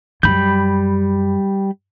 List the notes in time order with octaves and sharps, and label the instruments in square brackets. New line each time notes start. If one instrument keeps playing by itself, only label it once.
[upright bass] F#2 [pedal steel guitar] G3 B5 G6